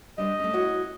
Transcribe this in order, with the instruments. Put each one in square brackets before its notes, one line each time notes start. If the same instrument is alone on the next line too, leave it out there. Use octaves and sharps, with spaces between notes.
[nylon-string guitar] G3 D4 C5 [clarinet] D#5
[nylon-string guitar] A3 C#4
E4 F#4 C#5